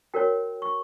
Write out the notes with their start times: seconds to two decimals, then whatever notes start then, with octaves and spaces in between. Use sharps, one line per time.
0.14 F#4 A#4 C#5 G5
0.62 C#6